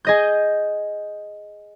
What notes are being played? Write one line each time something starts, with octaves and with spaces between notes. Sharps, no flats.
G#4 D#5 G6